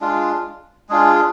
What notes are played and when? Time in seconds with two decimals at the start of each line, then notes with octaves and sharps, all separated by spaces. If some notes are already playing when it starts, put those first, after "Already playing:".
0.01 G#3 D4 F4
0.89 G#3 D4 F4 G#4